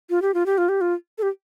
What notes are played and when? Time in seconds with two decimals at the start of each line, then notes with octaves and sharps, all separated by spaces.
0.10 F4
0.22 G4
0.34 F4
0.46 G4
0.58 F4
0.69 G4
0.81 F4
1.18 A4
1.22 G4